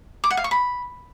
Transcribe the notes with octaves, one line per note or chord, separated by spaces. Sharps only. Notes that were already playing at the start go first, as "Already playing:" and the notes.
D6
F#5
F5
C#6
B5